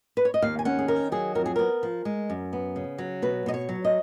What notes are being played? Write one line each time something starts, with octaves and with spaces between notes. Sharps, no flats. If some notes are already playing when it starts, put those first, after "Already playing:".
B4
C#5
D#5
D#2 F5
G#5
C#4 F#5
G#4
D#3 A#4
F#3 G#4
F2 A#4
G#4
B3 A#4
F3
G#3
F#2
B3
C#3
F#3
B2 B4
B2 D#5
C#5
F#3
D#5